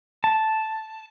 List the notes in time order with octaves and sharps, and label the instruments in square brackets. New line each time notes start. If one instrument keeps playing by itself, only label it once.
[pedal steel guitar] A5